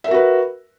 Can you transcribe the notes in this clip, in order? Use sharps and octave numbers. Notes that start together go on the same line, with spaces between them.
F#4 A#4 B4 E5